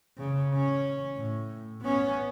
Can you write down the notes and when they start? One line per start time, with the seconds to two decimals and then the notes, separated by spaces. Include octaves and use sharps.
0.18 C#3
0.54 C#4
1.16 A2
1.82 B3 C#4